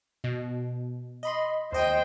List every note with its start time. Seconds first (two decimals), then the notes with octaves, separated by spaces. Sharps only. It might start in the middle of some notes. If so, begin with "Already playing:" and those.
0.24 B2
1.23 D#5 B5 C6
1.72 D#2 C5 D#5 G5 D#7